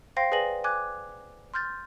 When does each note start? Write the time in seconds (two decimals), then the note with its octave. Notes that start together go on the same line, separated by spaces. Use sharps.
0.17 C5 F5 G5 C6 A#6 C7
0.32 G#4 B4 D5 G#5 A#6 F#7
0.64 G#5 D6 F#6 G#6
1.54 C6 F6 G6 A6